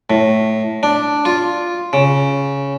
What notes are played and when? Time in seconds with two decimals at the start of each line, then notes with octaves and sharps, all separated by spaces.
0.10 A2
0.83 D4
1.25 F4
1.93 C#3